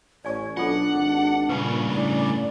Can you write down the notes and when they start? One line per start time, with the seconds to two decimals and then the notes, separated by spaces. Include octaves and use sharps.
0.25 A1 C#5 D5 G#5 C#6
0.57 B1 D4 F4 A4 F#5
0.93 G#1
1.49 G2 A#2 C#3 B4 C#6
1.92 A2 D5